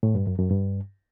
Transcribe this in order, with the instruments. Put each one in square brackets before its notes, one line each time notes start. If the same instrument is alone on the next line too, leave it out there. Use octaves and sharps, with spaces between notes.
[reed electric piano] A2
G2
F#2
F#2
G2